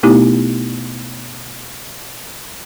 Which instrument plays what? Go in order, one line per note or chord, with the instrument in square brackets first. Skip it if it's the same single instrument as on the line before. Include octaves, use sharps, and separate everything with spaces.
[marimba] B2 A3 B3 D#4 E4 G4